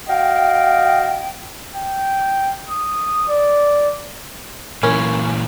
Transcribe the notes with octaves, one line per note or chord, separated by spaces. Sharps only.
F#4 D#5 F5 G5
G5
D#6
D5
A#2 E3 C#4 A#4